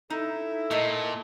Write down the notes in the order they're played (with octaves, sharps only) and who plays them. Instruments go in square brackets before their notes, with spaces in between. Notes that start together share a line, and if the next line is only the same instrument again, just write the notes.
[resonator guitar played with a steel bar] D#4 [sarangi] E4 [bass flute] A4
[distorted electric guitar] A#2 [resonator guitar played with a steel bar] A3 A#4 D#5